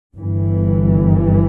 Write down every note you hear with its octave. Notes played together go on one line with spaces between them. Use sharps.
G1 G2 E3